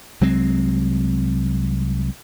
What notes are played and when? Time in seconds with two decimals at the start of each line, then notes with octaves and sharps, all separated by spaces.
0.21 C2 F#3 G#3 C4